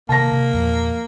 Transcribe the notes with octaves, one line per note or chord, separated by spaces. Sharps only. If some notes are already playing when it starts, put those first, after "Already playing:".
C3 D#3 A#3 A5 A#6
C3
E2 A#2 F3